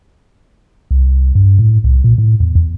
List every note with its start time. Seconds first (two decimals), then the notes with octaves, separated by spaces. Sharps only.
0.91 C2
1.35 G2
1.59 A2
1.84 C2
2.04 A#2
2.18 A2
2.40 E2
2.55 E2